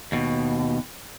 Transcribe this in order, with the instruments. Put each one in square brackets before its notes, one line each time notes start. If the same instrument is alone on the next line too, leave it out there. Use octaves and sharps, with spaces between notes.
[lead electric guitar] D#2 B2